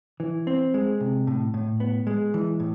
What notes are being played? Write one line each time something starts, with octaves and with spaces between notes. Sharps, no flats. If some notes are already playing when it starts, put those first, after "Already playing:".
E3
C4
G#3
C3
A2
A2
B3
G#3
E3
A2